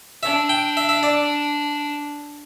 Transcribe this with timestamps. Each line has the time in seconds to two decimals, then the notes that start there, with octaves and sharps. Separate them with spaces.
0.23 D4 E5
0.49 G5
0.77 E5
0.89 E5
1.03 D5